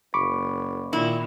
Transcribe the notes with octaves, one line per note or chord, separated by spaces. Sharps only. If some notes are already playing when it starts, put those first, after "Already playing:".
F#1 B5 C#6 D6
A#2 D#3 E4